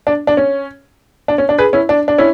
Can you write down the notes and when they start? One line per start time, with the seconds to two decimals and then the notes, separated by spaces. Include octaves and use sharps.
0.07 D4
0.27 D4
0.37 C#4
1.28 D4
1.38 C#4
1.49 D4
1.58 G#4 B4
1.73 C#4 E4
1.89 D4
2.08 D4
2.18 C#4 E4